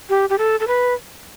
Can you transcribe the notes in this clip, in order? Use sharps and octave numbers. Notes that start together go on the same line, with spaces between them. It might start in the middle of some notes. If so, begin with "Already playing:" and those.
G4
G4
A4
A4
B4